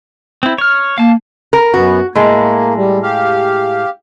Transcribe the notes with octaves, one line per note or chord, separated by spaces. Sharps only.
C4 E4
C#5 F6
A#3 F5 A5
A#4
F#2 B3 F#4
A2 G#3 A#3
G3
G4 F5